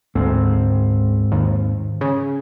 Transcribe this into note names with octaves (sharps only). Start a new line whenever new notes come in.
D2 G#2 C4
D#2
C#3